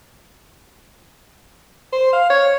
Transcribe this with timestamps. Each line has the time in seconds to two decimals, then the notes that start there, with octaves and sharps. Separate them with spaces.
1.92 C5
2.13 F5
2.30 C#5